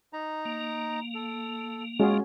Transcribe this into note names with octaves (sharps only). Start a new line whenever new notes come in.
D#4 A#5
A#3
A4
G#3 C#4 F4 F#4 G#4